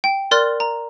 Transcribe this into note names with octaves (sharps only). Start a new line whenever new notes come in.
G5
A#4 D5 C6 F6 F#6 A6
A#5